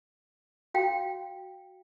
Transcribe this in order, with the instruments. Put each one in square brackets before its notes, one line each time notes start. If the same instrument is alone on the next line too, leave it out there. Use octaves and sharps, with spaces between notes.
[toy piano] F#4 F5 G5